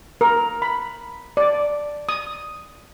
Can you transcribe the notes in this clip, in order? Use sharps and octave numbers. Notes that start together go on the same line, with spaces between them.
A#4
B5
D5
D#6